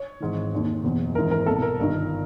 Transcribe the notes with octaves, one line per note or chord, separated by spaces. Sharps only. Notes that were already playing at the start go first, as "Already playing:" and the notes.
Already playing: C#5
G#1 G#2 E3
F1 D#2 D#3
F#1 E2 B2
G#1 G#2 E3 A#4
A#4
C2 B2 A4
A#4
G1 G2 D#3